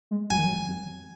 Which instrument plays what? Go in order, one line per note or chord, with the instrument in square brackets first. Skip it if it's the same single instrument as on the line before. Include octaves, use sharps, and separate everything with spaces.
[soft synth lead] G#3
[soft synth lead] F#3 [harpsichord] G#5
[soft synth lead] D#3
F#3